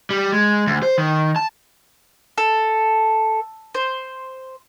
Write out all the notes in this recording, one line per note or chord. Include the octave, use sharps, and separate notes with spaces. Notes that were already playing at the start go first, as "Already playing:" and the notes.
G3
G#3
D2
C5
D#3
A5
A4
C5